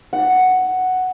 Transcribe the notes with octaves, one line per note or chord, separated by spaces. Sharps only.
F#5